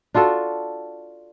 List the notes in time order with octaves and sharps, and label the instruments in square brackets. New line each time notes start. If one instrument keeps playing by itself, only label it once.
[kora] D4 F4 F#4 A4